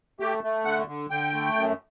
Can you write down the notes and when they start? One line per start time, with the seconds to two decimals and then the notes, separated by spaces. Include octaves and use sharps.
0.20 A3 G4
0.44 A3
0.65 D3 F#5
0.88 D3
1.10 D3 G5
1.34 A3
1.56 F#2